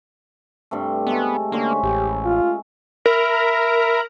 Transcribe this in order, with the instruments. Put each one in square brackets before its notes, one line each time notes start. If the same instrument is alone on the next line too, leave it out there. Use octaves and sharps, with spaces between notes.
[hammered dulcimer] G2 C3 A3
[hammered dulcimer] G#3 A3 [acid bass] B3
[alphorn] D3 [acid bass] A#3 [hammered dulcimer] C#4 C5 E5
[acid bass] A1 [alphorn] G4
[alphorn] F4
[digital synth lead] A#4 [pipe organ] E5 B5